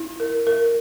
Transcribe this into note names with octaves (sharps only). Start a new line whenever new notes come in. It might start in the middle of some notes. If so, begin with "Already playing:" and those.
Already playing: E4
A#4
A#4